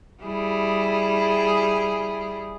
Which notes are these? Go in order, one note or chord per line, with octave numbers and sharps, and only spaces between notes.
G3 E4 G#4